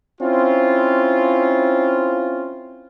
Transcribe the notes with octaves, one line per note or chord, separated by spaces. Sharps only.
C4 C#4 E4 F4